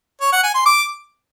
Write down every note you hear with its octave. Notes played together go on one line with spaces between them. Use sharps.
C#5
F#5
G#5
C6
D6